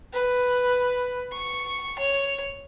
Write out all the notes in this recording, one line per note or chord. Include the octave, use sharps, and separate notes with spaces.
B4
C#6
C#5